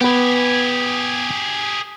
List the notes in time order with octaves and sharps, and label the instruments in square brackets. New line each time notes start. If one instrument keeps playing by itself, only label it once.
[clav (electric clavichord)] B3 B4 [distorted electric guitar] G4 G#4